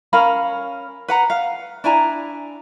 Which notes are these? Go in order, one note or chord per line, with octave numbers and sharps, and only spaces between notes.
C#4 A#4 F5 B5
B4 F#5 A#5
F5
D4 E4 G#5 A#5